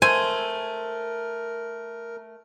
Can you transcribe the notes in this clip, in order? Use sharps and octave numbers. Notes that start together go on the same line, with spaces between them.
A3 A#4 C5 G#5